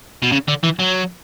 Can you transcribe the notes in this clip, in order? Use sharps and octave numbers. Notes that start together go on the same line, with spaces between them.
B2
C#3
D3
E3
F#3